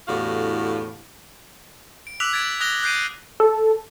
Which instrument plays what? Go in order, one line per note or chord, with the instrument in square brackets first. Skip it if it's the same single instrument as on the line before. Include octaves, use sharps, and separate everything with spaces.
[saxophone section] E2 A2 D3 F#4 G4 F5
[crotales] D7
D6 E6 F#6 B6 F7 F#7
G#6 A6 B6 D7
D#6 F#6 A#6 F7 G7
F#6 G6 C7 D7 D#7
[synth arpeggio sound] A4